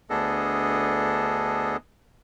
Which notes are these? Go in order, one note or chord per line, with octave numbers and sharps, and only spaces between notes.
D2 B3 D4 G#4 A4 D#5